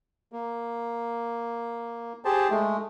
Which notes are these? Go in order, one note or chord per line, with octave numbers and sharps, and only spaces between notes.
A#3
G4 G#4 C5 A5
G#3 A3